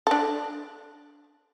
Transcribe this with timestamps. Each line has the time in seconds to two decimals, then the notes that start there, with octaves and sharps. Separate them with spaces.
0.07 D4 A4